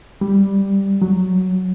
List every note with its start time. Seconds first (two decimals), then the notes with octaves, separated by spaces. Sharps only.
0.21 G3
1.02 F#3